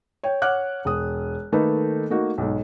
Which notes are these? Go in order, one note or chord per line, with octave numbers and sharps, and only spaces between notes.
C#5 G5
C#5 F#5 D6 F6 F#6
E1 D#6
D#3 A3 A#3 D#4 A4 B4
A3 A#3 D#4 F#4
B1 G#2